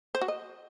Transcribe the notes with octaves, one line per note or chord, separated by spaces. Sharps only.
C5
F#4
D#5